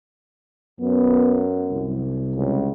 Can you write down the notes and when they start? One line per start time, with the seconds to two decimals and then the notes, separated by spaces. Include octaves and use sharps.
0.80 F#2 B3
1.72 C2
2.36 C#2